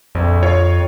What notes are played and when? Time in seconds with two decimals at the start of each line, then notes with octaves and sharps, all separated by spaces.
0.15 A#1 F2
0.43 F4 C#5